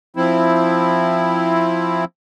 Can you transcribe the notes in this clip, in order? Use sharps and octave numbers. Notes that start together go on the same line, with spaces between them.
F3 C4 E4